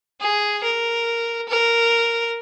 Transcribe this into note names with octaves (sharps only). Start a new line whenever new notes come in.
G#4
A#4
A#4